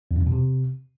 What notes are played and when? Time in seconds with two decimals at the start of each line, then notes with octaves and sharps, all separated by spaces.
0.11 E2
0.16 F#2
0.21 E2
0.27 B2
0.32 C3